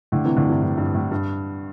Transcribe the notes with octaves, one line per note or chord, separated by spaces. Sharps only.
A2 D3
C3 E3
A2 D3
G2 C3
A2
G2
A2
G2